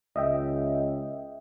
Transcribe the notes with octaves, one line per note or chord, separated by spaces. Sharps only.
C#2 D#5 E5 G5